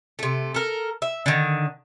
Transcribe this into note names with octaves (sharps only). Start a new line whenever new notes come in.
C3 A3
A4 A#4
E5
D3 D#3